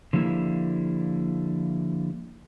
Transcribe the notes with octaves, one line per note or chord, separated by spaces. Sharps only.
D3 F3 G3 A#3 E4